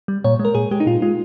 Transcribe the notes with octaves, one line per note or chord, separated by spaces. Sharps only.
G3
A#2 C#5
G#3
A#4
A#2 G#4
G#3 G4
D#4
A#2 F4
G#3 F4